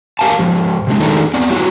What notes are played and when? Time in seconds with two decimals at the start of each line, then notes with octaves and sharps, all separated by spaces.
0.19 G4 A#4 F5 G#5 A5
0.39 G#2 F3
0.87 C3 G#3 D4
1.00 D#3 F3 G#3 A3 D4 D#4
1.34 B3 C4 D5
1.50 F#3 G3 E4 F#4 G4